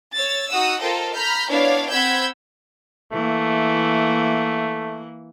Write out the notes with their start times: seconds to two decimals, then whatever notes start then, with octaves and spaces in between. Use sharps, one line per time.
0.14 C#5 E6 A6
0.50 D#4 F#4 F#5 D#6 E6
0.81 F4 A4 A#4 C5 D#5 G5
1.14 A#5 B5 F6 G6
1.49 B3 D4 E4 C#5 D5 F5
1.91 C4 F#5 B5 E6 G6 G#6
3.13 E3 A3 A#3